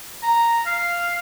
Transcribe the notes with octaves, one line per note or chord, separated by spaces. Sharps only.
A#5
F5